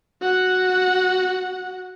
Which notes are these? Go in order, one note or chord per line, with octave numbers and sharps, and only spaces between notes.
F#4 F#5